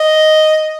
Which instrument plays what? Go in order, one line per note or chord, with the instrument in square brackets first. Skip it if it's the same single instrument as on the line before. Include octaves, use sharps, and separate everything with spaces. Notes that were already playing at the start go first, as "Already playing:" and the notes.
Already playing: [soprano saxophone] D#5